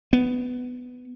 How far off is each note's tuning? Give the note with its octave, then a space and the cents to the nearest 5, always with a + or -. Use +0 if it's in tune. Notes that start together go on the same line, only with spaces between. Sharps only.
B3 +10